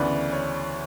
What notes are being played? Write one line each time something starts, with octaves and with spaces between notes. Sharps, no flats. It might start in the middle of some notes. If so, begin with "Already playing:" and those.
Already playing: D2 C#3 E3 B3 D5
C#5